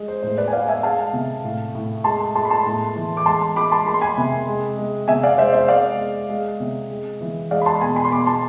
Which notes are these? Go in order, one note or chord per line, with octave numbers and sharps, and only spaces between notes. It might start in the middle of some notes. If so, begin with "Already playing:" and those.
Already playing: G#3
C5
A2 C5
B4 D5
G#5
G#3 D5 F5
E5 G#5
G#3 F5 A5
C3
A2
A2
G#3 A5 C6
G#3 A5 C6
B5
A5 C6
A2
E3
D6
G#3 A5 C6
G#3 B5 D6
A5 C6
G#3 B5
C6
G#5 B5
C3
G#3
G#3
C3 E5 G#5
D5 F5
G#3 C5 E5
C5 E5
G#3 D5 F5
G#3
G#3
C3
G#3
E3
G#3 D5 F5
B5
A5 C6
B2 G#5 B5
G#5 B5
C6
B2 B5 D6
A5 C6